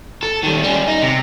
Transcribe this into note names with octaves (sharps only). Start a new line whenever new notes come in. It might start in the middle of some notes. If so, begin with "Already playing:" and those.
A4
D#3 G3
G3 C#4
D#4
C3